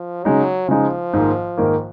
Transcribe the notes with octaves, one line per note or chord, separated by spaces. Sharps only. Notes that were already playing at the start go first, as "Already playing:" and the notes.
Already playing: F3
C#3 F#3 G#3 D#4
C#3 F3 G#3 D#4
G#2 D#3 A#3
G#2 D#3 A#3